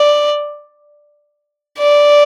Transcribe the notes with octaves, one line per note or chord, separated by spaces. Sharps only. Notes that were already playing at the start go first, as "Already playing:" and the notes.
Already playing: D5
D5